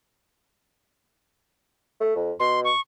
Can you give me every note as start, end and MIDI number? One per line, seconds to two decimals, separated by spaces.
2.00 2.15 57
2.16 2.32 41
2.40 2.69 47
2.40 2.60 84
2.64 2.80 85